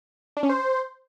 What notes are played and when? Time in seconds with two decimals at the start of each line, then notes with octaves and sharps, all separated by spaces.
0.37 D4
0.43 C#4
0.49 C5